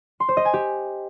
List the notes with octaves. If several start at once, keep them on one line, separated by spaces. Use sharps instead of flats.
C6
C5
D#5
G#5
G4